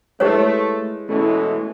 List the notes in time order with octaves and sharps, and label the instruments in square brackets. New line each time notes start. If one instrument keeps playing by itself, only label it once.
[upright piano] G#3 E4 [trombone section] A3 [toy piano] G4 B4 C#5
[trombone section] B2 E3 G#3 [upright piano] A3 C#4 E4